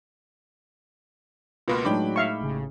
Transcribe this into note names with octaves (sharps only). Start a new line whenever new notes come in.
C#2 B2 A#3 F4 B4
A2 F#3 G#3 D4 D#4 G5 B5 D6
E5 F5 C#6
A1 C#3